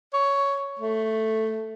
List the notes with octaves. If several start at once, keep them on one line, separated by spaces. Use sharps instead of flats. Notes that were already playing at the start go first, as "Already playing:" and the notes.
C#5
A3